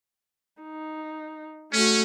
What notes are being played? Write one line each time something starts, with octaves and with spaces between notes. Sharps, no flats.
D#4
A3 C#4 F#4